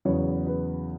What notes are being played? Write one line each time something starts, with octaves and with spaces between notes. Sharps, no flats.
E2 C#3 F#3 B3 C#5
B4